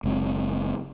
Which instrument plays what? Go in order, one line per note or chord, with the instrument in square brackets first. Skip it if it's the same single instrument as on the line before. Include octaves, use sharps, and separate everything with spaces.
[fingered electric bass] F#1 G#3 C4